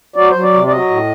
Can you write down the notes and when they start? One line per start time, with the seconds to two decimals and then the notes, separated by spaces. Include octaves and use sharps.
0.16 F#3 D5
0.30 F#3 C5
0.43 D5
0.53 C3
0.67 D5
0.71 F#3 D#5
0.90 A2